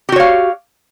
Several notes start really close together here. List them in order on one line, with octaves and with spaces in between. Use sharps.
G4 F#4 C#5 F5